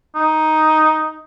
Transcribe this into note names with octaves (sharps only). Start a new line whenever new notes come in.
D#4